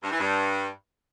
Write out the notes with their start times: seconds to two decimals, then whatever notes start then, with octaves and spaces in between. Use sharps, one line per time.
0.03 G2
0.11 E3
0.19 G2